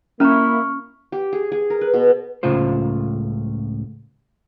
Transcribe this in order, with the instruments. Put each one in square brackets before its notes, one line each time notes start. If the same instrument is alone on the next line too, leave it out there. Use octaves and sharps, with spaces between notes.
[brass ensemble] A#3 E4 [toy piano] C#4 A#5 [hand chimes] C#6 F6
[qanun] G4
G#4
G#4
A#4
B4
B2
[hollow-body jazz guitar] C#2 A2 C#3 F4 C5